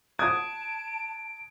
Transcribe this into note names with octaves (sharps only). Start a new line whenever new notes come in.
A5 D#6 G#6 D7